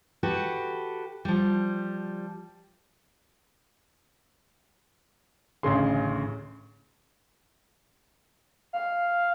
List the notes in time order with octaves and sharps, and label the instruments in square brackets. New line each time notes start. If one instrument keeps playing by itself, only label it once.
[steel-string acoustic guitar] F#4 G4 A4 B4
F3 G3
[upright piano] A1 D2 C#3 G#4 C6
[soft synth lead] F5